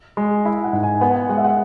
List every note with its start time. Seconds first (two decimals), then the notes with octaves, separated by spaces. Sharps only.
0.17 G#3
0.45 E4 E5
0.64 F#5
0.73 G#2
0.83 G#5
1.01 B3 F#5
1.11 G#5
1.16 F#5
1.29 G#3 F#5
1.37 E5
1.44 F#5